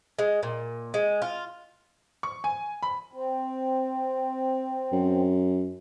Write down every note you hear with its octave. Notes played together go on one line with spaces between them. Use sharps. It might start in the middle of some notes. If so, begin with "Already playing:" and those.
G#3
A#2
G#3
F4
C#6
G#5
B5
C4
F#2